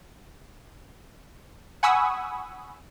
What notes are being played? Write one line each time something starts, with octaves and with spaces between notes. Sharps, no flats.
F#5 G#5 B5 C#6 D#6 E6